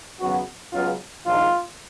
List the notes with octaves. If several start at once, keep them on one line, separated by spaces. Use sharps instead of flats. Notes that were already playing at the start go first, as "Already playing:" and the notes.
G#1 F#2 C#3 F#3 B3 F#4
C#2 C#3 F#3 B3 F4
A#1 G#2 D#3 F4